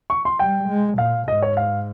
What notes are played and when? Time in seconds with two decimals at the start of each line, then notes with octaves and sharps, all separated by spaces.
0.10 C#6
0.25 C6
0.39 G3 G5
0.69 G#3
0.98 A#2 F5
1.28 G#2 D#5
1.42 C#5
1.57 F5